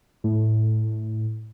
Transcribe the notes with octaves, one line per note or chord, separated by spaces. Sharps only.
A2